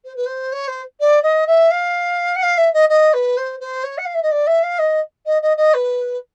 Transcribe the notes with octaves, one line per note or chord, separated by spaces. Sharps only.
C5
B4
C5
C#5
C5
D5
D#5
E5
F5
F#5
F5
E5
D#5
D#5
B4
C5
C5
C#5
F#5
F5
E5
D#5
D5
E5
F5
D#5
D#5
D#5
D#5
B4